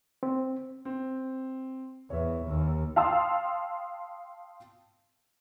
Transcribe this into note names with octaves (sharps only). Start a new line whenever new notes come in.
C4
C4
E2 C#5 E5
D#2
F5 G5 A5 C6 D#6 E6